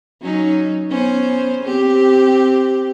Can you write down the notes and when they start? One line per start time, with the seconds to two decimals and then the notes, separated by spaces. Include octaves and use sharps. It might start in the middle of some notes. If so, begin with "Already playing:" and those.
0.22 F#3 C#4 D#4
0.89 B3 C#4 C5
1.64 C4 G4